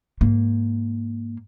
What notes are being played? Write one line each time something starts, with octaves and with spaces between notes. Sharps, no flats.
G#2 A#3